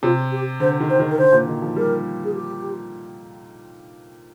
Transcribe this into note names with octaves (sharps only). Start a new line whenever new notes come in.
C3 F4
G4
D3 C5
D#3
C5
D#3
A#4
D3 C5
A#2
D#3
F3
G3 A#4
G#4
G4